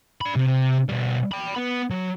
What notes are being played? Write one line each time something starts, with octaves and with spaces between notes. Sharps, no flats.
D4 B5
C3
B2 G3
G5 B5
B3
F#3